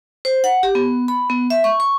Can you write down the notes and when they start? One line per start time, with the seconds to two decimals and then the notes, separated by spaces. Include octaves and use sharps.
0.25 C5
0.44 F#5
0.63 G4
0.75 B3
1.08 B5
1.30 B3
1.50 E5
1.64 C#6
1.80 C#6